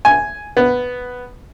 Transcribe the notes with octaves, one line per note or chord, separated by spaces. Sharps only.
G#5
B3